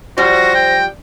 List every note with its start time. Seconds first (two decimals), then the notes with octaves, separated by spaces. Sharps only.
0.18 F3 G3 F#4 C5 A#6
0.55 G5